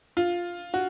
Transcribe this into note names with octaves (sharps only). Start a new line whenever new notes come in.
F4
F#4